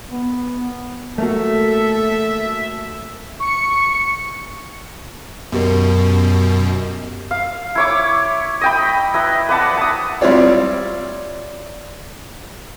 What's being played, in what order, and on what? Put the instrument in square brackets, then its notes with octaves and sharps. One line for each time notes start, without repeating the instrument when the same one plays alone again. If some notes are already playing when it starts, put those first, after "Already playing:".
[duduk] B3
[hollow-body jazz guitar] A3 A#3 F#4 [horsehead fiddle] A4 [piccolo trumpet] E5
[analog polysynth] C#6 C#7
[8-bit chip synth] F#2 B2 [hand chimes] B3 G4 A#4
[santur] F5
E4 C#5 D6
D#5 G5 B5
E4 B4 D#5
B4 D5 F#5 A5
A5 D#6
[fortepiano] G3 C4 E4 F4 C#5 D5